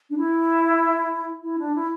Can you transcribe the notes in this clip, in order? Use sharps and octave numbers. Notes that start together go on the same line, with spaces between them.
D4
E4
E4
D4
E4